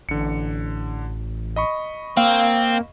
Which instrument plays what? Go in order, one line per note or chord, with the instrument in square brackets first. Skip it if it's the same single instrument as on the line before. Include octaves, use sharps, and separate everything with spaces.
[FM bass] A1 [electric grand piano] D3 C#7
[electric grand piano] D#5 B5 C#6
[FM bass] A#3 [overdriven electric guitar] C4 [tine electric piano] F5